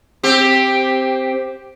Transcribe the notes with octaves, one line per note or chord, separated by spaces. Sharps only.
C4 G4